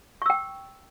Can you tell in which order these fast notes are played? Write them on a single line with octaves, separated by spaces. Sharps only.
C#6 E6 G5